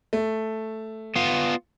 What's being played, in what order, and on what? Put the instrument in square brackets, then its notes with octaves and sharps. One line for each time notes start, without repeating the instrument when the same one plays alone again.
[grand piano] A3
[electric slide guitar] B3 F4